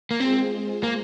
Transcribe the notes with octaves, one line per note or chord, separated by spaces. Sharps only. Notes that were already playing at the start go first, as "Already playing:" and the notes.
A#3
G#3 C4 F4 G#4 C5
A#3